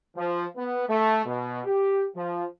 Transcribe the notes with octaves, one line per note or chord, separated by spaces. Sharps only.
F3
B3
A3
B2
G4
F3